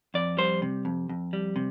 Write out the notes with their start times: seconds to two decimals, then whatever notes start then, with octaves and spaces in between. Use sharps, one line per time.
0.14 F2 D5
0.37 G3 C5
0.62 C3
0.85 F2
1.09 F2
1.33 G3
1.56 C3